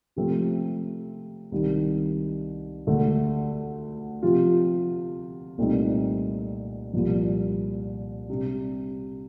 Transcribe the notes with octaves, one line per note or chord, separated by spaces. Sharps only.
C3 F3 A3 C4
C2 C3 D#3
D2 D3 A3
C3 F3 C4 F4
C2 A#2 A3 C4 D#4
C2 A#2 F3
C3 G3 D4